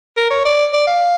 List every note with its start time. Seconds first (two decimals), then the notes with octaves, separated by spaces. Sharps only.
0.17 A#4
0.30 C#5
0.45 D5
0.73 D5
0.87 F5